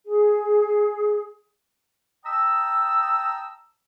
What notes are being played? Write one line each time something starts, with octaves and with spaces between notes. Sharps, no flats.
G#4
D#5 G5 A5 A#5 D#6 E6